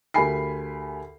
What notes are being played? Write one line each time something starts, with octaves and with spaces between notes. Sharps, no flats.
D2 G4 A#4 G#5 B5 C7